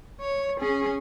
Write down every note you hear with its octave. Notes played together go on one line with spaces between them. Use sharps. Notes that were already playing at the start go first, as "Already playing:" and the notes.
C#5
C#4 G#4